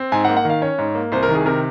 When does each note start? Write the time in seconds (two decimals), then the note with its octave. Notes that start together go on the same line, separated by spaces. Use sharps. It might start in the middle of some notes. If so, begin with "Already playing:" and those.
Already playing: C4
0.12 G#2 G#5
0.25 F#5
0.29 A#3
0.37 F#5
0.45 D#3 F5
0.62 C#4 C#5
0.78 G#2
0.95 A#3
1.12 C2 C5
1.23 A#4
1.29 D#3
1.34 G#4
1.45 C3 A#4